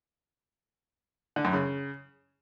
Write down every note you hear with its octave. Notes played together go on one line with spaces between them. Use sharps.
D3
F#2
C#3